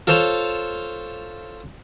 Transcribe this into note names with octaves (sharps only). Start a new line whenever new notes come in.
F4 A4 C5 C#5 A5